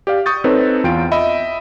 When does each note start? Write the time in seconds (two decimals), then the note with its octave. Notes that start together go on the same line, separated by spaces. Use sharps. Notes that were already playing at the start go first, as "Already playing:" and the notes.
0.07 G4 D5 F5
0.26 C#6 D#6 G6 A6
0.44 C4 D#4 A4 B4 C#5
0.84 E2 F4 G5 D7
1.12 D#5 E5 B5